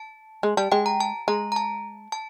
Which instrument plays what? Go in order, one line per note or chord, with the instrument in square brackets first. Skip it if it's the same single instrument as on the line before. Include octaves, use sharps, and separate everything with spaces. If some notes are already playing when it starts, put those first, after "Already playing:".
Already playing: [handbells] A5
[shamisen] G#3
[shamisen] G3 [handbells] A5
[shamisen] G#3 [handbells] G5
[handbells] A#5
A5
[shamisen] G#3 [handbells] A#5
[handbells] A#5
A5
A5